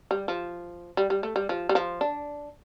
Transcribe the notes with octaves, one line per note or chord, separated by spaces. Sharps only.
G3
F3
G3
G3
A3
G3
F3
G3
F3
D4